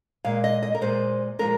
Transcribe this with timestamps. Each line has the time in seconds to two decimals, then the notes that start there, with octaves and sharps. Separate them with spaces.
0.25 A#2 G#3 F5
0.44 D#5
0.63 D#5
0.75 A#4
0.81 A#2 G#3 C5
1.39 A#2 F3 G#3 A#4